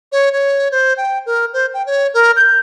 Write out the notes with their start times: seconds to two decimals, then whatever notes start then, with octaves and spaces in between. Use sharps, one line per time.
0.12 C#5
0.33 C#5
0.72 C5
0.98 G5
1.26 A#4
1.53 C5
1.74 G5
1.86 C#5
2.14 A#4
2.36 G6